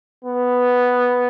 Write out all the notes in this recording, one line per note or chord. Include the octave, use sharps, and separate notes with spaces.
B3